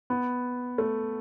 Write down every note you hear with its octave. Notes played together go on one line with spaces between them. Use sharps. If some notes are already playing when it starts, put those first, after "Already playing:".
B3
A3